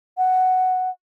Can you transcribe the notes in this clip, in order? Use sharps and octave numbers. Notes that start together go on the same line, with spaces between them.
F#5